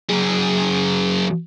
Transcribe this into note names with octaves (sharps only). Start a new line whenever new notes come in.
F#2 G#4